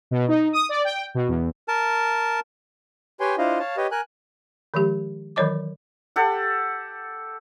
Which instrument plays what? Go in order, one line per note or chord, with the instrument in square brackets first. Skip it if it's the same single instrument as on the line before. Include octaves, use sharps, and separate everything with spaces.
[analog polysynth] B2
D#4
D#6
D5
G5
B2
E2
[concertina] A#4 A5
[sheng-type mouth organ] G4 B4 C#5 G5 G#5 C6
D4 E4 F4 C5 D#5 F5
C#5 F5 A5
G4 B4 C#5 D#5
A#4 G#5 F#6
[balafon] D#3 F3 G#3 G4
D#3 E3 F#3 C#5 D#5 D6
[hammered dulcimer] G4 A4 F#5